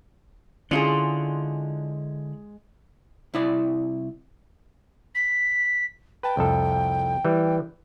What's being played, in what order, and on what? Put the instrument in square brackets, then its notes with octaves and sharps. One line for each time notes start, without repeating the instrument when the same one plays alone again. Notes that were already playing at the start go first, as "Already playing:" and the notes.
[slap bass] D3 [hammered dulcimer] G#3 [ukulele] C#4 E4 G#4 [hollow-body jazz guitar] D4 F4
[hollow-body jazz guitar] C2 E4 D5
[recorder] B6
[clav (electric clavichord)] B4 A5 [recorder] G5
[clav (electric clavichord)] C2 F2 A4
E3 G3